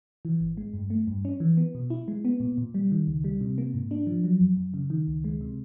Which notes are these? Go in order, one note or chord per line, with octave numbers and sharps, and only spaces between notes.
E3
G#1
G#3
G2
A3
G2
C#4
E3
B3
B2
E4
G#3
B3
A#2
A#2
G3
D#3
C#2
G3
C3
A#3
G#2
D4
F3
F#3
F#2
F#2
C#3
D#3
C#2
G#3
C3